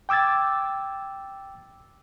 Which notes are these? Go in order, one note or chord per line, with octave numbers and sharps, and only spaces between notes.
G5 D6 E6 G#6 A6